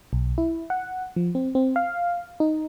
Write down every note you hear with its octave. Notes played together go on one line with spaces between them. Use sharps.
B1
E4
F#5
F3
C4
C4
F5
D#4